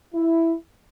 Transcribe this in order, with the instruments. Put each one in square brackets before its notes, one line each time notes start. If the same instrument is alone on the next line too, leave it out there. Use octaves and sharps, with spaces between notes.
[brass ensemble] E4